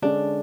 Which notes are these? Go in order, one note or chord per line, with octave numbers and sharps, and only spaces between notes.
D3 G#3 C#4 D4